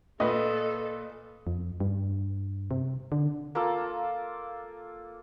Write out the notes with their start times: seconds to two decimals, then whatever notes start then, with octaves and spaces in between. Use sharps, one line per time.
0.20 A#2 A4 B4 D#5
1.47 F2
1.80 G2
2.71 C3
3.12 D3
3.55 A#3 F4 A4